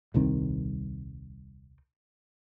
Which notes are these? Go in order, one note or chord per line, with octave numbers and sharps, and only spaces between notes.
D#1 C2 D#3 C4